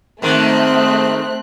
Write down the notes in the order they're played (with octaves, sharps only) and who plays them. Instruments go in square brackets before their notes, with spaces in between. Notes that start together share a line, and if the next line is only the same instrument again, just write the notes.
[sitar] G#2 D#3 [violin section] A3 C4 F#6